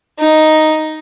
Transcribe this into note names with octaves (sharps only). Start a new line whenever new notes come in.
D#4